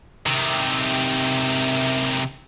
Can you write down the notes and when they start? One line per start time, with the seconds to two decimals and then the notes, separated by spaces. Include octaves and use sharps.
0.26 C3 D#3